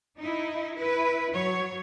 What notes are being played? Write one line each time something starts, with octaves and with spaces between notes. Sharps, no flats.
D#4 E4
E4 B4
F#3 C#5